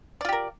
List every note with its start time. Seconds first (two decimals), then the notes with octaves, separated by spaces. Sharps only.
0.21 D5
0.25 F4
0.29 G4
0.33 A#4